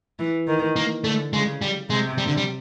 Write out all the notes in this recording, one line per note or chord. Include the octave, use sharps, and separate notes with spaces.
E3
D#3
A#3
D3 A3
C#3 G#3
G3
C3 G#3
G3
D3
G3